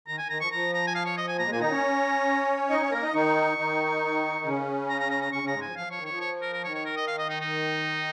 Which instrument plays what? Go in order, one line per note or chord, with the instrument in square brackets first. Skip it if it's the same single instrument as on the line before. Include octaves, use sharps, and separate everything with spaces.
[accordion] D#3 [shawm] A#5
[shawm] G#5
[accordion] D#3 [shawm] A#5
[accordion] F3 [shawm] C#6
[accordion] F3 [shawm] A#5
[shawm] A#5
G#5
F5
C#5
D#5
G#5
[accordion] A#2 A#3 [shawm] A#5
[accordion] G#3
[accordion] A#2 A#3 [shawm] G#5
[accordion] D#3 D#4 [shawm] A#5
[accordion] C#4 C#5
[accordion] D#4 D#5 [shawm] C#6
[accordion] C#4 C#5
[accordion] A#3 A#4 [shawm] A#5
[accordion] D#4 D#5
[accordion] D#3 D#4 [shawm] C#6
[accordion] D#3 D#4
C#3 C#4
[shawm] A#5
A#5
A#5
A#5
[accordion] C#3 C#4 [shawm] C#6
[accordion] C#3 C#4 [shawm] A#5
[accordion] G#2 G#3
[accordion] F3 [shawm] G#5
[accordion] F3 [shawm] F5
[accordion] F3 [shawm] C#5
[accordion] D#3
[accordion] F3 [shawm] C#5
[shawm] C#5
A#4
A#4
[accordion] D#3 [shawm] C#5
[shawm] C#5
A#4
D#5
F5
D#5
D#4
D#4